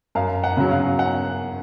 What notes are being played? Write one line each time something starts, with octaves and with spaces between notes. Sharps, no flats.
F#2 F5
F#5
C#3 F#3
F5
F#5